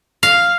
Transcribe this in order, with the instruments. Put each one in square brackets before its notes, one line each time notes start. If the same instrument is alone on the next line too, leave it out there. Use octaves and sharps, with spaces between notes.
[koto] F5